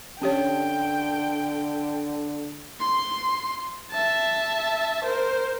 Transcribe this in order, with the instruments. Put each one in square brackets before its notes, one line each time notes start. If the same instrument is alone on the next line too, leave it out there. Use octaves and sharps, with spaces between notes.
[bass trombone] D3 [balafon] C#4 G4 C#5 [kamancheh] G5
[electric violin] C6
E5 A5
A#4 C5